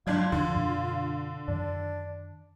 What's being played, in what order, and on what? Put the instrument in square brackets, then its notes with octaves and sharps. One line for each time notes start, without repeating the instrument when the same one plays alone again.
[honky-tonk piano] G1 D4 G#6 [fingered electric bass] F#3 G#3 [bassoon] F4
[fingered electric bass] E2 F3 [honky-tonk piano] D3
[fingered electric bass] F#2 B2
[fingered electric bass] F#2 D#3 [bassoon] D4